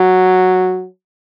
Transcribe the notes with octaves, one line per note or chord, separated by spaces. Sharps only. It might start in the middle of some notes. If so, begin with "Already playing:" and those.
Already playing: F#3